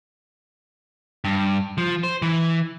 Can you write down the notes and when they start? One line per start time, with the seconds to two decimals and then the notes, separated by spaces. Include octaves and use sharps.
1.25 G2
1.78 F3
2.04 C5
2.22 E3